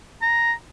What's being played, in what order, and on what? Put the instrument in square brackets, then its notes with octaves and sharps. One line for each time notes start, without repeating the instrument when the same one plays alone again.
[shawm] A#5